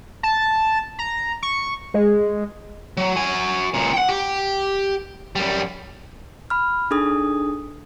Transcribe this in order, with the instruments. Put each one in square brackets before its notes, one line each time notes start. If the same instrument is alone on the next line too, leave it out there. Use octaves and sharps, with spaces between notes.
[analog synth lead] A5
A#5
C#6
G#3
[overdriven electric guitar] F#3
F#4 G#5
C#2 A#2
F#5 G5
G4
F#2 G3
[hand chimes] B5 F6
D4 D#4 G#4 A4 D#6